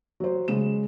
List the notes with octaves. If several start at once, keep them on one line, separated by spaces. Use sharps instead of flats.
F#3 C5
C#3 G#3 E7